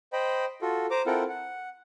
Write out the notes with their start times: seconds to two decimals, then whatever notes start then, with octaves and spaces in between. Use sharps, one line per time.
0.13 C5 D#5 G5 B5
0.62 F4 F#4 A4
0.91 C5 A#5 D6
1.06 C4 E4 F4 A4 A#4 F#5
1.29 F#5